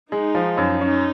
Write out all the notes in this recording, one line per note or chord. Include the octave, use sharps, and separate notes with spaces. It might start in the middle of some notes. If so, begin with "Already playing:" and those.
G#3 D#4
F3
F#2
C#4 D#4